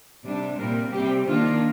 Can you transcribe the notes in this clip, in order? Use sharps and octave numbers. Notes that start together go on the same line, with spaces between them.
C3 G3 D4
A#2 G3 C4 A#4
C3 G3 C4 G4
D#3 A#3 D4 F4